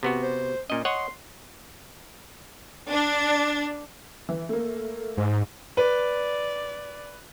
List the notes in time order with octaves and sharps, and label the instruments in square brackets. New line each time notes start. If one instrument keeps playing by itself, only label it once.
[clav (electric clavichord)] C3 B3 F#4
[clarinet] C5
[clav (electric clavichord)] A#2 D#5 [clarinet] C#4
[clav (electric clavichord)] C#5 D#5 F#5 [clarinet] C6
[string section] D4
[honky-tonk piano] E3
A3 A#3
[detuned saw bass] G#2
[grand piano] B4 [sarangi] D5